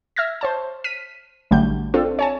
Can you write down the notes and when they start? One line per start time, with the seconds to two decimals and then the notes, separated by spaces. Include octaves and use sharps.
0.16 E5 F6 G#6 A#6
0.41 C5 C#5 A5
0.84 F6 B6 D#7
1.51 A1 D3 F#3 G3 A3 G6
1.94 C4 D4 F4 A4
2.19 C#5 G#5 A5